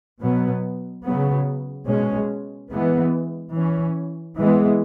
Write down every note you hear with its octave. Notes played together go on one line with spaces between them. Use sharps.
B2 F#3 B3
C#3 F#3 B3
B2 G#3 C#4
E3 G#3 B3
E3
C#4
E3 G#3 B3